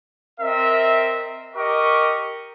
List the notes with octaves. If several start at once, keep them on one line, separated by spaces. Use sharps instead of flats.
C4 A#4 D#5 E5
G4 A#4 D#5 C#6